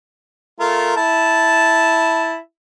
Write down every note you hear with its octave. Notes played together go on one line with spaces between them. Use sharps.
A3 F4 A#4
E4 A5